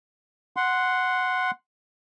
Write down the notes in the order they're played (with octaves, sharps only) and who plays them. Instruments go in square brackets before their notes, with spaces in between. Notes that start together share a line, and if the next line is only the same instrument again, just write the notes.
[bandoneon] F#5 C6